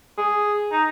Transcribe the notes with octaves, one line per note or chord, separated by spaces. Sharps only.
G#4
D#4